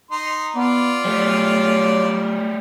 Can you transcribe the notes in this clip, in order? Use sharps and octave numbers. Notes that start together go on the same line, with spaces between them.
D#4 C6
B3 F4 D5
F#3 G3 A3